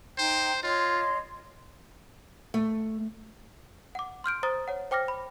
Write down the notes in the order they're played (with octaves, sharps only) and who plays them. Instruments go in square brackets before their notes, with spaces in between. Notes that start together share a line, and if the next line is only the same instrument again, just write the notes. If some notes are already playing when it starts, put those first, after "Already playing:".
[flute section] D#4 G5 A#5 [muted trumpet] C5
[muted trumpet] F4 [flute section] C#5 D#5 C6
[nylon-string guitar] A3
[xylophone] F#5 D6
C6 F6 G6 D7
C5 A#5 D#6 A6
C#5 F#5
C5 G5 D6 F6 A#6
B5